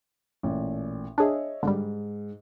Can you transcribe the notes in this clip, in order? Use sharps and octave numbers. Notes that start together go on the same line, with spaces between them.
A1 A#2
D4 G#4 C#5 D#5 E5
G#2 D3 G3